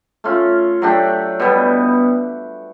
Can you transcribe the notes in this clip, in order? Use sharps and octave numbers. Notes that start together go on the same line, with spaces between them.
A3 C#4 F4
F#3 A3 D4 G4
B2 G3 B3